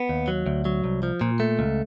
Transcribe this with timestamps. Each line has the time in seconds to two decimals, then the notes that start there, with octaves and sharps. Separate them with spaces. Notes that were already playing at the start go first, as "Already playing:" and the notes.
Already playing: B3
0.09 D#2
0.28 F#3
0.46 D2
0.65 F#3
0.84 C2
1.03 F3
1.21 A#2
1.40 A3
1.59 C#2